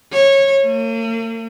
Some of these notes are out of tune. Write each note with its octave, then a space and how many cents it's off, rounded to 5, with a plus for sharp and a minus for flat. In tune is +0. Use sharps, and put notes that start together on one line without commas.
C#5 -20
A#3 -45